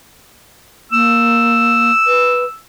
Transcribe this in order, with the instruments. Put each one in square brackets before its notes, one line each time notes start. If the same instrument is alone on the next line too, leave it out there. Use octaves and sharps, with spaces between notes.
[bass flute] A#3 [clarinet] E6
[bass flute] B4